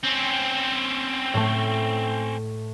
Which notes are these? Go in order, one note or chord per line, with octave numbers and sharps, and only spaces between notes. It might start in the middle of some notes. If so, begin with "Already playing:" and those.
C4 C#4
A2 A3